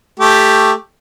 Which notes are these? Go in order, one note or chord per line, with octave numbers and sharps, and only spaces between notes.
A3 G4